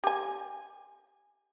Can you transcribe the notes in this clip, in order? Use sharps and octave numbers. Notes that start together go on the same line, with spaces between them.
G4 G#5